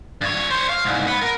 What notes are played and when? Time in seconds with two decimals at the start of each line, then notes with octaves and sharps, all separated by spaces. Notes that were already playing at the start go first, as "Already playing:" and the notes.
0.21 G2 C#5
0.51 C5 C#5
0.69 F5
0.84 C2 G#2
1.07 F#5 B5
1.22 A#4